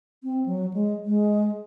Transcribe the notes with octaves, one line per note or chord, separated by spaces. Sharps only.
C4
F#3
G#3
G#3